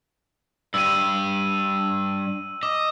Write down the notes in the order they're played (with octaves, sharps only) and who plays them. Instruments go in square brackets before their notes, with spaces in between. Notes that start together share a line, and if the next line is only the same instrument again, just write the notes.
[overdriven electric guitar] G2 G4 [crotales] E6 D#7
[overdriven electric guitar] D#5 [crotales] D6